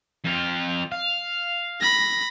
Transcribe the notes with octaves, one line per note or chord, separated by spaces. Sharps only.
F2 F4
F5
B5 A#6